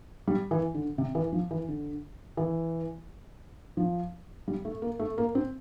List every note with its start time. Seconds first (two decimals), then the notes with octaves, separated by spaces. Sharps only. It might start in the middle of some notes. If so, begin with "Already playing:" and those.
0.27 G3
0.51 E3
0.74 D3
0.98 C3
1.15 E3
1.33 F3
1.51 E3
1.68 D3
2.37 E3
3.77 F3
4.48 G3
4.65 A3
4.82 A#3
4.99 A3
5.18 A#3
5.35 C4